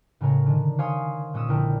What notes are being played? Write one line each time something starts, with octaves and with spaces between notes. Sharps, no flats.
A2 C#3 G#3 A#4 C#5
D3 D#3
C5 C#5 F5 G#5 C6 D#6
A#2 G#3 C#4 C#5 D#6 E6
A#1 D3 E4 A#4 G5 F6